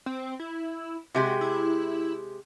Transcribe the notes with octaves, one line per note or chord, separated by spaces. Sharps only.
C4
E4
C3 G#3 F#4 G4
E4